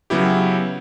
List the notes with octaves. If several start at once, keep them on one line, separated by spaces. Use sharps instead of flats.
C#3 F#3 B3 E4 G4